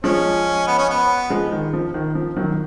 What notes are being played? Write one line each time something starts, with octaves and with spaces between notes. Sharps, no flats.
F3 G#3 C#4
B3
C#4
B3
F3 G#3
D#3
F3
D#3
F3
D#3 F#3